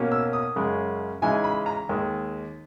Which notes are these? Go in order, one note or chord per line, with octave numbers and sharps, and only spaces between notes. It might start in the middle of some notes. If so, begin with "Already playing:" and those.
Already playing: B2 A#3 C#4
E6
D#6
F#2 C#3 G#3
C#3 E3 G#3 D#4 G#5
B5
A#5
D#2 D#3 G#3